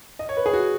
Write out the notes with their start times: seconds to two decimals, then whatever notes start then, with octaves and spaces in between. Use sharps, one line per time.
0.19 D#5
0.29 C#5
0.37 B4
0.46 G#4
0.53 F#4